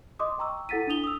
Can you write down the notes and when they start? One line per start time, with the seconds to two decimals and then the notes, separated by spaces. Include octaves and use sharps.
0.19 D#5 C6 D6 D#6
0.39 G5 A#5 C#6 E6
0.69 E4 A4 F#5 A6 B6 D#7
0.87 D4 E4 D#6 F7 G7
1.04 D#6 E6